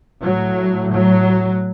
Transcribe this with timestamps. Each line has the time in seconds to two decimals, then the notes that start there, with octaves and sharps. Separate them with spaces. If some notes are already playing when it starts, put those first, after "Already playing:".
0.22 A2 F#3
0.91 F#3